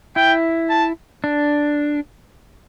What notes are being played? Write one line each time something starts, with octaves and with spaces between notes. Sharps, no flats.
E4 G5
A5
D4